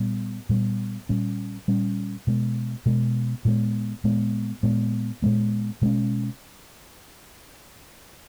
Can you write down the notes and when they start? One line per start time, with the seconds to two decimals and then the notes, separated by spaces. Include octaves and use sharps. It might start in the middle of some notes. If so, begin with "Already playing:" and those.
Already playing: A#2 G3 B3
0.49 A#2 G3 B3
1.09 A#2 G3 C#4
1.68 A#2 G3 C#4
2.27 B2 G#3 B3
2.86 B2 G#3 B3
3.45 A#2 G#3 B3
4.04 A#2 G#3 B3
4.63 A#2 G#3 B3
5.22 A#2 G#3 B3
5.82 B2 G#3 C#4